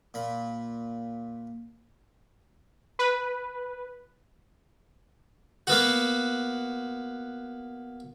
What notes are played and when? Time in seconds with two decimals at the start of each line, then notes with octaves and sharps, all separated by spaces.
0.14 A#2 B5
2.99 B4
5.67 A#3 B3 F#4